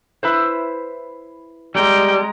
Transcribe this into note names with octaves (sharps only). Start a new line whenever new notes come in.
E4 B4 C5
G3 G#3 G5 A#5